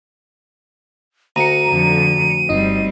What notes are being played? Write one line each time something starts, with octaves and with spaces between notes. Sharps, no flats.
D2 A#5 C#7 D#7
F2 D3
G1 G3 C4 D#4 D#5